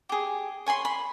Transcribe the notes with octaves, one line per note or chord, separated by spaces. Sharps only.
G4 G#4
C#5 G#5 B5 C6
B5 C6